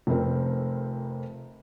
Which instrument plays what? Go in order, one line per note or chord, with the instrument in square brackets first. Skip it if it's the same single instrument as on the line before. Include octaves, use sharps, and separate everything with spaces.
[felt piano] F1 F2 C4 A#4